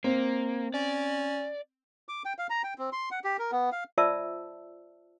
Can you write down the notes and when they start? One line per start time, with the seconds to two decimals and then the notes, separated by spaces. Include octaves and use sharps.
0.04 A#3 C4
0.74 C#4 D5
2.09 D6
2.25 G5
2.39 F5
2.50 A#5
2.64 G5
2.78 C4
2.92 C6
3.11 F#5
3.24 G4
3.39 A#4
3.52 B3
3.72 F5
3.98 F4 C5 D5 E5 A5 E6